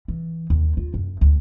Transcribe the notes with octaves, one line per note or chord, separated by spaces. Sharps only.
E3
D#2
F4
F#2
D2